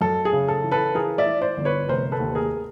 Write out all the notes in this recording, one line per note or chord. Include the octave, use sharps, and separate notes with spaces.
F#2 A4
G#4
C#3
A4
E3
A4 B4
E3 G#4 A#4
D5 E5
E3
C5 D5
G1
B4 C#5
F1 A#4 C5
A4 B4
D#2
G#4 A#4